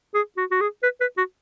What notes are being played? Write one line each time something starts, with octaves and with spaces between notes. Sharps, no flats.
G#4
F#4
F#4
G#4
B4
B4
F#4